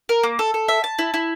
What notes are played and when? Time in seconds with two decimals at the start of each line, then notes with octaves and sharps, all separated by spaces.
0.09 A#4
0.23 A#3
0.39 A4
0.54 A4
0.68 E5
0.84 A5
0.99 E4
1.14 E4